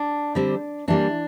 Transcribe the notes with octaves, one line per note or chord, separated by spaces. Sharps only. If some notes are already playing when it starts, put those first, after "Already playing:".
Already playing: D4
D3 G3 C4
E3 G3 A#3 D4